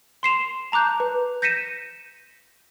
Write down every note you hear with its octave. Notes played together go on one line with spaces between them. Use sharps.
C6 C7 E7 F7
A5 A#5 D6 F#6 G6
B4
G6 A#6 B6 C#7 D#7 E7